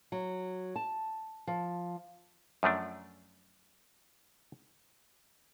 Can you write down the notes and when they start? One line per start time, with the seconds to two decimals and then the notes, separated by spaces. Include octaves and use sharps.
0.12 F#3
0.76 A5
1.47 F3
2.63 F#2 F3 A3 D4